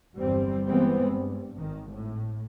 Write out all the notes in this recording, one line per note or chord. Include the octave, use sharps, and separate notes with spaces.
G1 E2 G3 C4
E3 G3 G#3 B3 C4
G2
G#1 D#3
A2